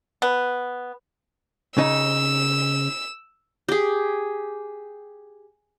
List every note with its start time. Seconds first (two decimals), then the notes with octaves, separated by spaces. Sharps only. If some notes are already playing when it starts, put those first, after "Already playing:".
0.22 B3
1.78 C#3 D#4 E6
3.68 G4 G#4